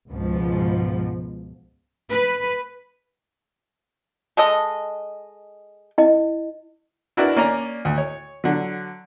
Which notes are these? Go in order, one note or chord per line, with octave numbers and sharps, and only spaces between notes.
C#2 G#2 B2 F3
B4
G#3 A4 D#5
E4 D#5
D4 E4 F#4 A#4 B4 D5
A#3 C#4 D5 A#5
D2
C#5
D3 F#3